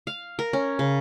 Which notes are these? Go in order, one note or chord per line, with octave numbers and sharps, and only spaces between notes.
F5
A#4
C#4
C#3